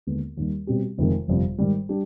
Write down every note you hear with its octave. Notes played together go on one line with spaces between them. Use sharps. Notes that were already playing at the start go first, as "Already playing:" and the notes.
D#2 D3 G#3 B3
D#2 D#3 G3
B2 G3 C4 G4
F1 F2 C3 D#3 G#3
G1 F2 C3 G3
G#2 D#3 G3
G3 D4 G4